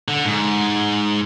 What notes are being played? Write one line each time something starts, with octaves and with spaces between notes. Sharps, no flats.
D3
G#2